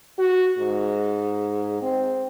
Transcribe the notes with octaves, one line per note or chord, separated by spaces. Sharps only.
F#4
G#2
C4